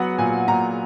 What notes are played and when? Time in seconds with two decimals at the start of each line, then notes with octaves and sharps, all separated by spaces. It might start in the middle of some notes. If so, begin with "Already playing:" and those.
Already playing: F#3 B3 F#5
0.18 A#2 G#5
0.48 A#2 A#5